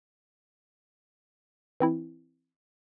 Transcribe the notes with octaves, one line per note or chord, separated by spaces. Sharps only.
E3 C4 E4